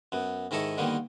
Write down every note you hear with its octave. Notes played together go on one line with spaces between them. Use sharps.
F#2 B3
G#2 D#3 E4 A4 D#5 C#6
D3 D#3 G3 A#3 B3